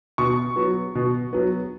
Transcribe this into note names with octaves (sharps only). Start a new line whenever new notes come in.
B2 C#6
F#3 B3
B2
F#3 B3